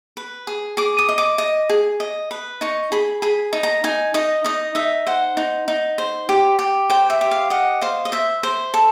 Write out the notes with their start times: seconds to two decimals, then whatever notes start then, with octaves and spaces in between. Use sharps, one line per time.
0.17 B4
0.47 G#4
0.77 G#4 D6
0.99 D#6
1.09 D#5
1.18 D6
1.38 D#5
1.69 G#4
2.00 D#5
2.31 B4
2.61 D#4 C#6
2.92 G#4 B5
3.22 G#4 B5
3.53 D#4
3.63 A#5
3.84 D#4 G#5
4.14 D#4 D#5
4.44 D#4 D#5
4.75 D#4 E5
5.07 C5 F#5
5.37 D#4
5.68 D#4
5.98 C5
6.29 G4
6.59 G4
6.90 C5 G5
7.10 E5
7.21 G4
7.31 F5
7.50 D#5 F#5
7.81 C5 F5
8.05 D#5
8.12 C5 E5
8.43 C5
8.74 A4